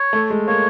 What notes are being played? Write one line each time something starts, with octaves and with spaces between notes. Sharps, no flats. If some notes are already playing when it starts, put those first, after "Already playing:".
Already playing: C#5
A3
G#3
A#3 C#5